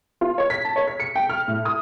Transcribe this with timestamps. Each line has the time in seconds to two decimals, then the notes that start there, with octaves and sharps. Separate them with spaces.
0.21 F4
0.38 C#5
0.50 B6
0.65 A5
0.76 C#5
0.87 B6
1.00 C#7
1.16 G5
1.30 F6
1.48 A2
1.65 D#6